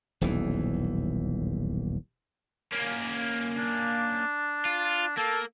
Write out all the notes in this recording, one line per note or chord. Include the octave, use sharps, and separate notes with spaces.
D#1 B1 E2 E3
A#3 C#4
D4
F4
A#3 A4